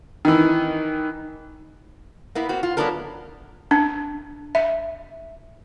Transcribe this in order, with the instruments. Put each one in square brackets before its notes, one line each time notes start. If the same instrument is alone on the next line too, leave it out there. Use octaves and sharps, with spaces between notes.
[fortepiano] D#3 E3
[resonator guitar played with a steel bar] A#3 B3 E4
A#3 C4 F#4
F4
F#3 A3 B3 D4 A4 A#4
[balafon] D4
E5